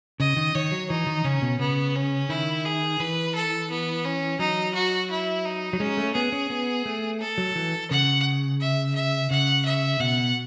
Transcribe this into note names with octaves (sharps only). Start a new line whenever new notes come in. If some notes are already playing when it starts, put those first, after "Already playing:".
C#3 D#5
D#3
D#3 C#5
F#3
E3 D#4
D#3
C#3 C#4
B2
C#3 B3
C#4
D#3 E4
G#4
E3 B4
A4
B3
C#4
F#3 D#4
F#4
E4
D#4
F#3
G#3 C#4
A3
B3 G#4
C#4
B3
A3
A4
F#3
E3
C#3 F#5
E5
E5
C#3 F#5
E5
B2 F#5